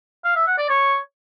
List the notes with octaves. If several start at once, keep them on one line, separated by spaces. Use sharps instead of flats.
F5
E5
F#5
D5
C#5